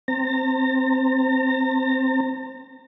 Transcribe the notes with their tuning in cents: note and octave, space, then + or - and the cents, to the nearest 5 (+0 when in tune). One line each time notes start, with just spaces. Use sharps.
C4 +0 A#5 -40